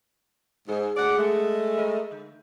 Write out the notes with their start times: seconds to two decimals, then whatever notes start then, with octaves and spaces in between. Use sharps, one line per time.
0.68 G#2 G#4
0.97 D2 D5 F#5
1.18 G#3 A3
1.77 A#4 D#5
2.11 D3